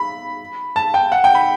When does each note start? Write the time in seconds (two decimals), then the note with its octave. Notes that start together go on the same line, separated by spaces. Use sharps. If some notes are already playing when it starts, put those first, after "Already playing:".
Already playing: B5
0.76 A5
0.94 G5
1.12 F#5
1.24 G5
1.35 B5